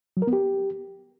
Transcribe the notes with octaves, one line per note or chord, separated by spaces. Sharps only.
F#3
A#4
B3
G4